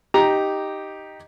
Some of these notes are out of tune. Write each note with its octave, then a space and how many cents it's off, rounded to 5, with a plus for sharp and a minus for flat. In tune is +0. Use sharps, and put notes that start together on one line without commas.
D#4 +0 G4 +0 A#5 +5